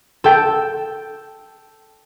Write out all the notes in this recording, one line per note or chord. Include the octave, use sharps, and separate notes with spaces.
A4 G5